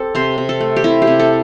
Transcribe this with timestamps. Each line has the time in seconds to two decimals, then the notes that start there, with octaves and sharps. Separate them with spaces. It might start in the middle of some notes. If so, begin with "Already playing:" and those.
Already playing: C4 G4 A4
0.15 C3 C5
0.38 C3
0.49 A4
0.60 A3
0.76 G4
0.84 C3 E4
1.02 G4
1.07 C3
1.19 A4